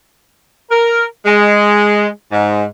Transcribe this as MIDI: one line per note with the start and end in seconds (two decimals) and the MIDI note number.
0.70 1.04 70
1.26 2.08 56
2.32 2.63 44